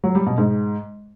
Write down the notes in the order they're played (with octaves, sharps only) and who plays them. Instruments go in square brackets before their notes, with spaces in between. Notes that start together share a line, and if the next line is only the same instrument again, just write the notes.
[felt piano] F#3
G3
B2
G#2